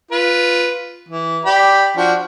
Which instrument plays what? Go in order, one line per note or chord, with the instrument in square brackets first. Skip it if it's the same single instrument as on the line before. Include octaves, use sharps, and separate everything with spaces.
[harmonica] F4 B4
E3
G4 D5 B5
F3 D4 F#4